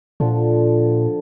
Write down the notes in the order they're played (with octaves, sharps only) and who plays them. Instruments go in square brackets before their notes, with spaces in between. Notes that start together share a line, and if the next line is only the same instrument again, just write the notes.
[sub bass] A#2 [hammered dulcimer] D3 F3